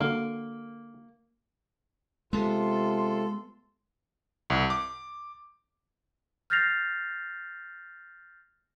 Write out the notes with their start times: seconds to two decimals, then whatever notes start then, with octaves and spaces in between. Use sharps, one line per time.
0.01 D3 A#3 F#4
2.33 C3 G#3 B3 F4 A4 C6
4.50 C2
4.70 D6
6.50 F6 G6 A6 A#6 C7 F7